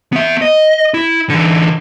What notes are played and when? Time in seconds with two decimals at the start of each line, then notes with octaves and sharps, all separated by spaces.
0.13 B3 E5
0.42 D#5
0.94 E4
1.30 D3 E3